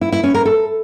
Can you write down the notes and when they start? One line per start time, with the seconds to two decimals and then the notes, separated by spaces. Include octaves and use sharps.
0.01 E4
0.12 E4
0.23 C#4
0.34 A#4
0.45 A4